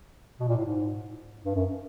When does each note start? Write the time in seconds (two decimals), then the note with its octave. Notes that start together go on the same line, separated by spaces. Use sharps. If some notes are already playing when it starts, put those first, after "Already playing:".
0.40 B2
0.48 A#2
0.56 A2
0.65 G#2
1.45 G2
1.55 F#2